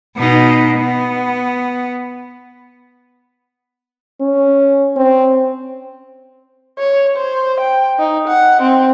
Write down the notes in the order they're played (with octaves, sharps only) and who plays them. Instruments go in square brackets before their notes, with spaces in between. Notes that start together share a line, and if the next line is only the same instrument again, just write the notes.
[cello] B2 D#4
B3
[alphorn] C#4
C4
[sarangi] C#5
C5
G5
D#4
F#5
C4